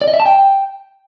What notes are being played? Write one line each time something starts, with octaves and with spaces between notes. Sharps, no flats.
D5
D#5
E5
A5
G5